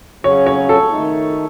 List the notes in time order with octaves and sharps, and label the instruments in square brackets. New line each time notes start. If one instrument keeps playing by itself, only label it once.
[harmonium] C#3 F#3 C#4 [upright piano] C#5
[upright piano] C#5
A4
[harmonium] D#3 A3 D#4